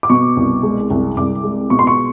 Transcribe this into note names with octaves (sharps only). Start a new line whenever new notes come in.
D6
B2 C#6
C2
G#3
C2
C2 D6
G#3
B2 C#6
C6
C#6